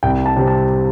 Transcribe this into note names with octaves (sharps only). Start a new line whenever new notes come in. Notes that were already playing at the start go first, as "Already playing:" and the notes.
C2 G5
A5
C3 G3 C4
A5